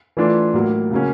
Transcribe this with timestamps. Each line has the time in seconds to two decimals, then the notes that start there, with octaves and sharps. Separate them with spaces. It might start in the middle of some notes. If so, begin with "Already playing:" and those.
0.17 E3 A3 D4 F4
0.54 A2 F#3 A#3
0.91 C#3 F#3 A#3 C#4